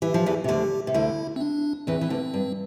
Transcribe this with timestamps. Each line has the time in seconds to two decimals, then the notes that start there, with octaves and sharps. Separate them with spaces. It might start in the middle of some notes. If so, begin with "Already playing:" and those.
0.02 E3 G4
0.14 F3
0.26 E2 E3
0.44 C3
0.48 D2 D3 G4
0.87 C3
0.94 D2 D3 E4
1.36 C4
1.41 D4
1.87 E2 E3 C4
2.01 E3
2.10 D2 D3
2.34 G2